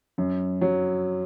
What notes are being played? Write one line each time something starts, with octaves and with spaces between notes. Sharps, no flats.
F#2
F#3